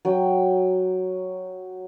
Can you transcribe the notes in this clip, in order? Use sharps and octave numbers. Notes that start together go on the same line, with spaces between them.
F#3 G5